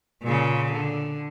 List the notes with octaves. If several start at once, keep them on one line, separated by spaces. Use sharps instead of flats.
A#2 C#3
D3